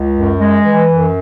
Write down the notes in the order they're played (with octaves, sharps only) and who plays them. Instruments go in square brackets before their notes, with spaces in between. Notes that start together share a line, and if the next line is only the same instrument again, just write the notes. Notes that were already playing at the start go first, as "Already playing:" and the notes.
Already playing: [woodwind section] C#2
F#2
G#3
E3
F#2